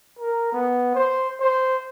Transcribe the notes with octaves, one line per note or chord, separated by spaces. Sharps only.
A#4
B3
C5
C5